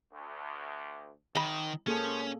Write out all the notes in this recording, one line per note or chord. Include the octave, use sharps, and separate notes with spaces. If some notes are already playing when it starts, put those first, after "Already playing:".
D2
G#1 D#3 D#5 B5
F3 A#3 C#4 G#4 A4